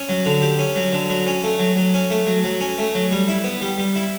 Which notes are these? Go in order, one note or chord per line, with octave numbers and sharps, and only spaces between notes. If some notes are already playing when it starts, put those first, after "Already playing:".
Already playing: C#4
F#3
D3
G4
C#4
F#3
D3
F#3
C#4
A3
F#3
F#3
C#4
A3
F#3
F#3
C#4
A3
F#3
G3
E4
B3
G3
G3
E4